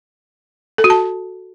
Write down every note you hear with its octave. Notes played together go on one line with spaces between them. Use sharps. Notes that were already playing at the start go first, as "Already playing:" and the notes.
A4
F#4
A5